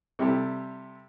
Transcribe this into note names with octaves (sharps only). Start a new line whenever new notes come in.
C3 G3 E4 G4 A4